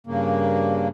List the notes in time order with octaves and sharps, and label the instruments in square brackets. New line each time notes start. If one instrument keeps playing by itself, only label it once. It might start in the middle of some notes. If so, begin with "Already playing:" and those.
[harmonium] G2 C#3 A#3